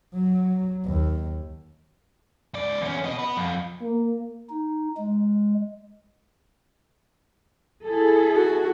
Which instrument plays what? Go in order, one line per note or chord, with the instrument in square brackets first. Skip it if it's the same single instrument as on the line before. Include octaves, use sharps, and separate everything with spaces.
[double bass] F#3
D#2
[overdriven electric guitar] C#2 D5
E2 C#4
B3 D#5
B3 B4
F2
[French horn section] A#3
[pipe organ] D#4
G#3
[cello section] E4 G#4 A4
[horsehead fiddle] F#4